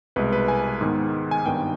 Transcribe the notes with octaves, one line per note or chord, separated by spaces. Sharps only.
C2 B2 G#3 B4
B4
G#5
G#2 D#3 G#3 B3
G#5
G#1 G2 D#3 B3 G5